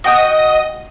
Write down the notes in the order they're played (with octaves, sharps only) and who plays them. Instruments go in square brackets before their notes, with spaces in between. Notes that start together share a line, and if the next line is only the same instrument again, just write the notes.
[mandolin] F#4 G5 [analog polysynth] D#5 D#6